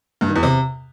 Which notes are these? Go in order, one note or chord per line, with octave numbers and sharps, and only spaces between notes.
G2
D#3
E2
C3